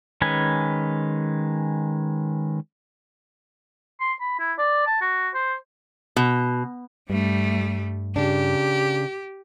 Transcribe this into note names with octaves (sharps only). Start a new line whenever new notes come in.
D#3 G#3 C#4 B4 G#5
C6
B5
E4
D5
A5
F#4
C5
B2
G2 G3 A3
C#3 D4 G4